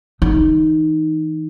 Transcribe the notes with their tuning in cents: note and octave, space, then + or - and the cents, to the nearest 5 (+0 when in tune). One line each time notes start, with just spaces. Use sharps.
E3 -40 D#4 +0